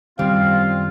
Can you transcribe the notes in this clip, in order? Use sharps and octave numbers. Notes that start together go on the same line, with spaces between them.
F#2 D#3 G3 C4 F4 F5